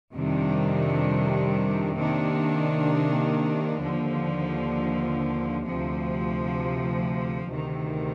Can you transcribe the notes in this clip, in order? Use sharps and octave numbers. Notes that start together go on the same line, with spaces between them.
F2 C3 D#3 G3 D4
C3 D#3 A#3 D4
D#2 D3 F3
D2 C3 F3
D2 C3 D#3